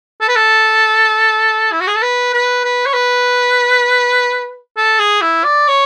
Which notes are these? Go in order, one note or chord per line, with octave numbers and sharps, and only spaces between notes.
A4
B4
A4
E4
F#4
G#4
A4
B4
B4
B4
C#5
B4
A4
G#4
E4
D5
C#5